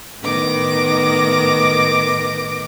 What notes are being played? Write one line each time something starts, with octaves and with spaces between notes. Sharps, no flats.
A2 D#3 B3 D6 A#6